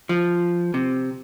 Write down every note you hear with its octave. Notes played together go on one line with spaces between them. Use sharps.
F3
C3